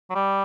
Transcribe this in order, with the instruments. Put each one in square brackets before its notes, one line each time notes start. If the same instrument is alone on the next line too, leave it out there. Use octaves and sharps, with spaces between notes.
[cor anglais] F#3
G3